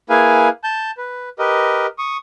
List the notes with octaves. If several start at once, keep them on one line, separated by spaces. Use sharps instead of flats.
A#3 E4 G#4 B4 F5 G#5
A5 G6
B4
G4 A#4 B4 D#5
C#6 D#6